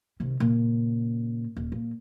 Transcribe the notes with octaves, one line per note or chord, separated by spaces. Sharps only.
C3 D#3
A#2 C#3
D#1
A#2